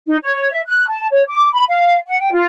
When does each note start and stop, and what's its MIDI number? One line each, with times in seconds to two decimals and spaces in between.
0.07 0.17 63
0.22 0.49 73
0.51 0.62 76
0.65 0.85 90
0.88 1.06 81
1.10 1.22 73
1.27 1.48 86
1.53 1.63 83
1.69 1.96 77
2.07 2.18 78
2.20 2.32 79
2.32 2.45 65